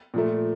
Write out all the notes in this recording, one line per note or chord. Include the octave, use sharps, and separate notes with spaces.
A#2 F3 A3